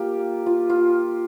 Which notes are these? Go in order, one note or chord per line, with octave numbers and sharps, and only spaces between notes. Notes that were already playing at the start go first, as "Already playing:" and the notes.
Already playing: A#3 F4 G4
F4
F4